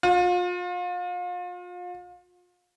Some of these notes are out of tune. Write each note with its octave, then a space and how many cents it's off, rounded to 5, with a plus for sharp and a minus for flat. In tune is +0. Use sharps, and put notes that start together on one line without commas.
F4 +35